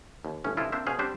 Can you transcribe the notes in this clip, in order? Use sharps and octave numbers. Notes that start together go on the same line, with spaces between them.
D#2
G1 A2 C#4
C2 D3 E3 E4 F4 D#5
A#3 C4 D4 C5 E5
B2 C#4 G#4 C5 F5
G3 C4 D4 G4 C5 F#5